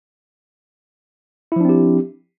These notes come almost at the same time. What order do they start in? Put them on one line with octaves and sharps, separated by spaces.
E4 F3 D4 C4 G4